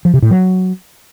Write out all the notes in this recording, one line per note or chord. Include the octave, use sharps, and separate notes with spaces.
F3
C3
A2
F#3